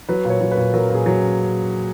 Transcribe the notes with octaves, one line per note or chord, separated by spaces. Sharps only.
F#3 B4
A#2
C#5
F#3
B4
A#2
F#3 A#4
A#2 G#4
F#3